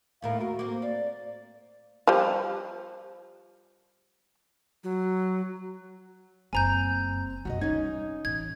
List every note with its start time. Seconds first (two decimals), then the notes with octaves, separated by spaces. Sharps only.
0.22 D#2 A2 A#4 F5
0.41 F#4 A#4
0.59 A#3 C4
0.82 D5 F5
2.07 F3 G3
4.84 F#3
6.53 F#1 F#2 C4 G#5 A#5 G6
7.45 C2 F#2 F#4 D#5
7.61 G3 C#4 D#4 G#6
8.25 A1 G#6